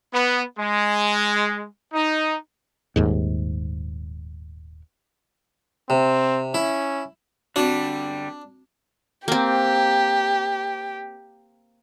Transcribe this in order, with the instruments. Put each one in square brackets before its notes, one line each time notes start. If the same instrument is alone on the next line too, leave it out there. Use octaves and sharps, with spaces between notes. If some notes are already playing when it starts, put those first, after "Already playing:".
[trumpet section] B3
G#3
D#4
[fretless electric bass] D#1 D#2 G#2
[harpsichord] C3 [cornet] C4
[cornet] C#4 [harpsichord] E4
[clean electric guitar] D3 G3 [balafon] C4 F#4 [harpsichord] D4
[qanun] A#3 C4 [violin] G4